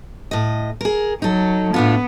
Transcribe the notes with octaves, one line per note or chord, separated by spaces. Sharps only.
A2 D#5
G#4 A#4
F#3 D#4 A4
A2 B3 D4 F4